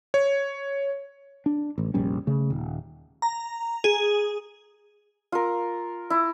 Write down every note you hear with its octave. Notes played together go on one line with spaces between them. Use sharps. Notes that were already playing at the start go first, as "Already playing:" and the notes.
C#5
D4
A1
F1 A#1 G3 C#4
C#3 A3
D#1
A#5
G#4
F4 A#4
E4